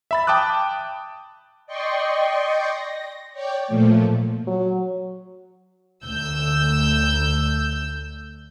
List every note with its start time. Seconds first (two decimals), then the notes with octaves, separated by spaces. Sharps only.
0.11 E5 B5 A6
0.27 G5 A5 D6 D#6 F#6
1.67 D5 D#5 G5 C6 C#6
2.69 A#6
3.33 C#5 D5 G5
3.68 A#2 F3 A3
4.47 F#3
6.05 D2 E6 G6